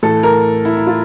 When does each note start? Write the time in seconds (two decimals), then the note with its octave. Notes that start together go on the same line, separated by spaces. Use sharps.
0.03 A2 E3 A4
0.23 A#4
0.65 E4
0.77 E4
0.87 F4